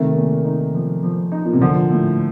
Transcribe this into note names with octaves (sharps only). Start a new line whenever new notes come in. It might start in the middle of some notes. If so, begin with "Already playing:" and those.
Already playing: C3 D#3 A3
A#2
D#4
F3
F3
D#4
A#2
C3
A#2 D3 F3
A2